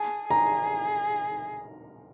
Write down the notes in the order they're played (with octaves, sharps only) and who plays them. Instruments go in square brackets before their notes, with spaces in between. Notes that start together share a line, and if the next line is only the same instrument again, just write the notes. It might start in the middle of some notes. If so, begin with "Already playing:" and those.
Already playing: [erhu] G#4 [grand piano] A5
[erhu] G#4 [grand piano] A#5